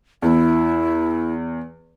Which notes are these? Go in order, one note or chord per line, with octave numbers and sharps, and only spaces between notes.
E2 E4